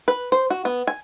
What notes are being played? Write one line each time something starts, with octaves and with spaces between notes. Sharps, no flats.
B4
C5
F#4
B3
G#5